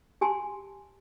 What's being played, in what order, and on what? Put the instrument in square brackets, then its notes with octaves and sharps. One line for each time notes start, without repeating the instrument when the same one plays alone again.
[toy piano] G4 G#5 A5 C6